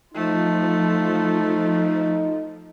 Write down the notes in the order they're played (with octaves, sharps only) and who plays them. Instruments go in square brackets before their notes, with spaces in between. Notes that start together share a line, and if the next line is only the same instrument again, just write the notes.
[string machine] F3 [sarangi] A3 [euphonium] D#4 [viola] F4 A4